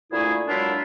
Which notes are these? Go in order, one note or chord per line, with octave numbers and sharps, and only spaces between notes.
D2 A#2 A3 E4 G#4
A#2 F#3 G#3 D4 E4 F4